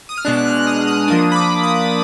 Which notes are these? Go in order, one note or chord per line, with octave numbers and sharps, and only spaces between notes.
D#6
F6
B2 G#3 D4 F#6
F#6
F6
D#6
D#6
F3 A#3 D4 D#6
B5
D6
D#6